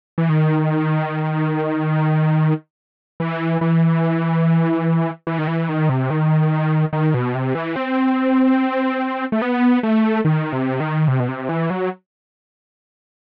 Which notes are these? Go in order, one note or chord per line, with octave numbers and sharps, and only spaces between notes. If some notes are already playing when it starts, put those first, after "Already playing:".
E3
D#3
E3
E3
E3
D#3
E3
D#3
C3
D#3
D#3
B2
C3
E3
C4
A3
B3
A3
D#3
C3
D#3
C3
B2
C3
E3
F#3